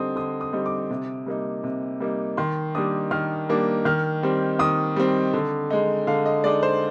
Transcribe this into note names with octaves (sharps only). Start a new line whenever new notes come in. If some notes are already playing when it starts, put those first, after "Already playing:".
Already playing: D3 G3 C4 D#4 D#6
D3 D#6
D#6
G3 C4 D#4
D6
C3
G3 A#3 D#4
C3
G3 A#3 D#4
D#3 C6
G3 A#3 D4 D#6
D#3 F6
G3 A#3 D4
D#3 F6
G3 C4
D#3 D#6
G3 C4
D3
G#3 D#4
D3 F5
D#5
G#3 D#4 D5
C5